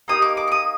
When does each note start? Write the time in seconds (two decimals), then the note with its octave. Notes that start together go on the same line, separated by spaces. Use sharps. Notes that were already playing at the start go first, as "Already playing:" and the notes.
0.08 A#3 D#4 G4 D#6
0.22 D6
0.37 D6
0.47 D6
0.52 D#6